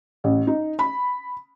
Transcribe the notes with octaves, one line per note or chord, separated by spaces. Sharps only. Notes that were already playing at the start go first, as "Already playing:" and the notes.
A1
D#4
B5